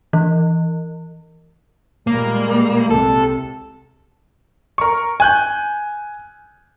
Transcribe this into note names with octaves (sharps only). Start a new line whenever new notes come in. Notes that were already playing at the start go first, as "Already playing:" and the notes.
E3
A#2 G3 G#3 A#3
C2 C3 A4
A#4 C#6
G#5 F#6 G6